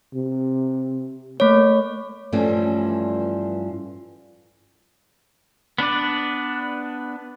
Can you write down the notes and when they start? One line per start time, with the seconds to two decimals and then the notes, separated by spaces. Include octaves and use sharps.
0.14 C3
1.40 A3 A#3 C#5
2.32 G2 E3 F3 G3 A3 C#4
5.78 B3 D4 B4 D5